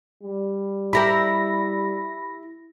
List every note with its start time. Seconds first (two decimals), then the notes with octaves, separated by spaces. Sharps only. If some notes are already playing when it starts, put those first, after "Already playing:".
0.23 G3
0.93 E4 G4 A#4 B5 A#6